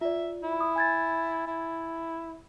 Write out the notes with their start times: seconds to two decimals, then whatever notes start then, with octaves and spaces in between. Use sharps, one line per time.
0.01 F4 D5 E5
0.43 E4
0.60 D#6
0.76 G#5 G#6 A6
1.47 E4